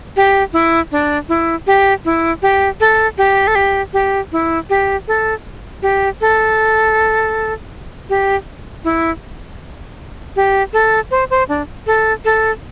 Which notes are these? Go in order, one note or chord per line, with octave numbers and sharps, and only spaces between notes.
G4
E4
D4
E4
G4
E4
G4
A4
G4
A4
G4
G4
E4
G4
A4
G4
A4
G4
E4
G4
A4
C5
C5
D4
A4
A4